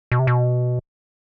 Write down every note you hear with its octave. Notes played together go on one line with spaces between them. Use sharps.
B2
C3
B2